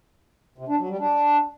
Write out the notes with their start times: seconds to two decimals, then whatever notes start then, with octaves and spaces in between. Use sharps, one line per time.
0.58 C3
0.68 D4
0.79 F#3
0.89 G3
1.00 D4